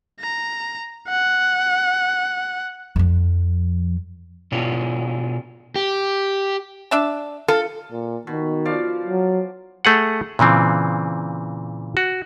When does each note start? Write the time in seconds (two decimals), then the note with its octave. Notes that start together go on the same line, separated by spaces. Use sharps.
0.21 A#5
1.09 F#5
2.96 F2 F3
4.52 B2 D4 E4 F4 C#5
5.76 G4
6.91 D4 E5 A5
7.48 F4 A4
7.92 A#2
8.27 B2 D#3
8.65 F3 D5 F5
9.07 F#3
9.85 A3 G#4 F#5
10.39 A#2 C#3 E3 C4
11.97 F#4